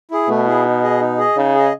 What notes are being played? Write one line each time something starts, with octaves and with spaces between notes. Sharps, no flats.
E4 G#4
B2 A3
E4 G#4
D#4
G#4 D#5
D#4
G#4 D#5
C#3 D#4
G#4 D#5